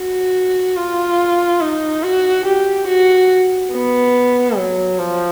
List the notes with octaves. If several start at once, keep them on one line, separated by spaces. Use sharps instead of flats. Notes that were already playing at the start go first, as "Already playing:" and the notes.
Already playing: F#4
F4
D#4
F#4
G4
F#4
B3
F#3
F3